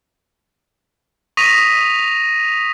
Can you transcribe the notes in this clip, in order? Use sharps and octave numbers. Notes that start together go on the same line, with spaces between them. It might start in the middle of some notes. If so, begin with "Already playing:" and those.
C#6 D#6 A#6 B6 D#7 F7